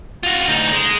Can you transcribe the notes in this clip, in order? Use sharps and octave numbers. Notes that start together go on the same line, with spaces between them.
F4 F#4
D2 D#4
G#3